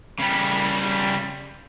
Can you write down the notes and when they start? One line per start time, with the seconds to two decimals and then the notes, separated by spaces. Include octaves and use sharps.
0.20 C#3 G3